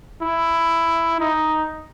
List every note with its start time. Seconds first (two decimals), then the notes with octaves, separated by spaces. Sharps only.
0.22 E4
1.20 D#4